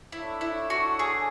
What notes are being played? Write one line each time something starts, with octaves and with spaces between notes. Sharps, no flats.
D4 E4 A4 C#5
E4
F#4
G#4